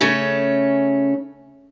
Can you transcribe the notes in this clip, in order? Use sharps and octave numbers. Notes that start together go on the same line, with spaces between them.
C#3 A3 C#4